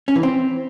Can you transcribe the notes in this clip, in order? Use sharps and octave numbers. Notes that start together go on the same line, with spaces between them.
C#4
E3
C4